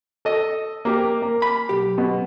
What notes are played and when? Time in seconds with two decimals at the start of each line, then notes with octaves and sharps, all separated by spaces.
0.25 A4 D#5
0.85 A#3 G4 A#4
1.22 A#3
1.42 B5
1.69 B1 G4
1.98 B2